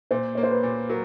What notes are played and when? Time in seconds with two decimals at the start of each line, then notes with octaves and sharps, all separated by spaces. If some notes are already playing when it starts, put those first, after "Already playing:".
0.11 A#2 C5
0.35 A#3 C#5
0.43 C5
0.51 B4
0.63 A#2
0.89 F#3 A#4